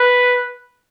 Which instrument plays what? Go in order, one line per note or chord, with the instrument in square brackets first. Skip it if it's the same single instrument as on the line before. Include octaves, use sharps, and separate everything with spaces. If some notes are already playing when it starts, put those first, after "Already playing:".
Already playing: [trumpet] B4